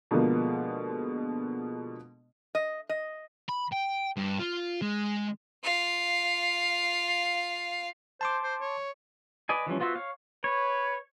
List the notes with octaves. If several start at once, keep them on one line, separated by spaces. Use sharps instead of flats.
B2 D3 F3 G#3 A#3 B3
D#5
D#5
B5
G5
G2
F4
G#3
F4 F5
C5 A5 C6 D6
C5
C#5
B4 D5 D#5 G#5
E3 F3 G3 C#4
B3 F4 F#4 C5 E5
C#5 F5
B4 C#5